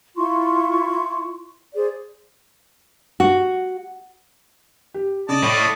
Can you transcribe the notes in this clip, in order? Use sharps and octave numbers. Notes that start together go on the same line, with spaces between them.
E4 F4 C6 C#6
G#4 C5 D5
F#4
G4
C#3 D5 D#5 A5 A6
A2 C#6